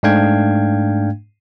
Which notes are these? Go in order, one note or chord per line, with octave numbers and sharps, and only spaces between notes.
G#2 A3 D4 F5 G5 G#6